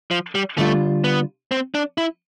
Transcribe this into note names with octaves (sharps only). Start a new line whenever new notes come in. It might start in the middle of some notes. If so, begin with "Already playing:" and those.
F3
G3
D3 G3 A3 D4 F4
B3
C4
D4
E4